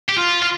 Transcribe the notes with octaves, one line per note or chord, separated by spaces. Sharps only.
G4
F4
F4